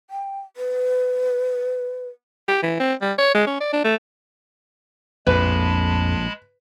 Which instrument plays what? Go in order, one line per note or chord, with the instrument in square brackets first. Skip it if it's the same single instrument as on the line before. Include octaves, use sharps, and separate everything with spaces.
[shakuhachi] G5
B4
[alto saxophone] G4
E3
C4
G3
C#5
G#3
C#4
D5
D4
A3
[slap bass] A#1 A2 [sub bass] F2 [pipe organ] G#3 A5 B5 [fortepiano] B4